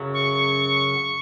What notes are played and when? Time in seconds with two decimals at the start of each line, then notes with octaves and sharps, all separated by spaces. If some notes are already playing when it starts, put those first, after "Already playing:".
Already playing: F#2 C#3 F#3
0.14 C#6